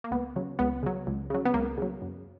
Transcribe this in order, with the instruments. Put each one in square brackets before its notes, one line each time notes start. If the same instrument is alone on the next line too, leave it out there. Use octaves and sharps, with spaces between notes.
[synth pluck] A#3
C#2 B3
C#3 F#3
C#2 B3
C#3 F#3
C#2
C#3 F#3
B3
C#2 A#3
C#3 F#3
F#2